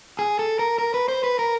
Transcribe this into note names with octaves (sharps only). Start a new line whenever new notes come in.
G#4
A4
A#4
A#4
B4
C5
B4
A#4